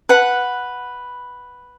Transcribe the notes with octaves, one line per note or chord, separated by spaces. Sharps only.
B4 F#5 B5